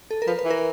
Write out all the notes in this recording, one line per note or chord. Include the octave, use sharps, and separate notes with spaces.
A4
A#4
F3 B4
B4
E3
A#4